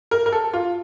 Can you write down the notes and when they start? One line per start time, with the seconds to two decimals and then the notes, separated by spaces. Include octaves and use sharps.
0.11 A#4
0.26 A#4
0.32 A4
0.53 F4